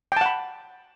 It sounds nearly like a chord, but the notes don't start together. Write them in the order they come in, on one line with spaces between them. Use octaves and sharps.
G5 A5 F#5 B5